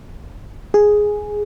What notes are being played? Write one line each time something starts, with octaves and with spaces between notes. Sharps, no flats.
G#4